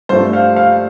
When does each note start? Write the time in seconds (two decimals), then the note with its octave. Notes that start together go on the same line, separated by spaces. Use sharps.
0.09 G2 F3 A3 C5
0.33 F5
0.56 F5